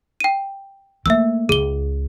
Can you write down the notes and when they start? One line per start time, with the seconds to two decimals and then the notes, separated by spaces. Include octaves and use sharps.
0.20 G5 D#7
1.06 A3 A#3 E5 E6
1.49 C#2 G#4 G7